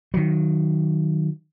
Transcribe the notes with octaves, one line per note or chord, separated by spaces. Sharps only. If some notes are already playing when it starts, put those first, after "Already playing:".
D#3 F#3